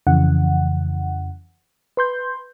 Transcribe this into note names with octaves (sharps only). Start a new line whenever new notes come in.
F2 C#3 E3 F#5
B4 C6 G6